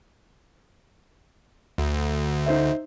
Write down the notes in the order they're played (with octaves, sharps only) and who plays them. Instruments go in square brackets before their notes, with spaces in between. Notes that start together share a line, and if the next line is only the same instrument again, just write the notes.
[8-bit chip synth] D2
[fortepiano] D#4 C5 E5